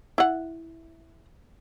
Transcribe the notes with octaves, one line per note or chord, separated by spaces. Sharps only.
E4 F#5